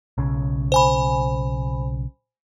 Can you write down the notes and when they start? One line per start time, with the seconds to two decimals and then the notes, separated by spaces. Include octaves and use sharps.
0.18 B1 C#3
0.72 C5 G#5 B5